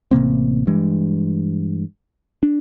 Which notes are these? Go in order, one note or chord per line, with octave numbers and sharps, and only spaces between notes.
A1 C3 A#3 C4
G2 E3 G#3
D4